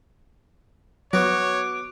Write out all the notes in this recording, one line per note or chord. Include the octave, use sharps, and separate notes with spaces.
F#3 B3 F#4 C#5 D6